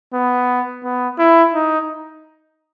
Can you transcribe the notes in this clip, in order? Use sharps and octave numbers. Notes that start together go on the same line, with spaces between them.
B3
B3
E4
D#4